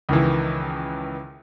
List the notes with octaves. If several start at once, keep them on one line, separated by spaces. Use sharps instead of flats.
C#2 D#3 E3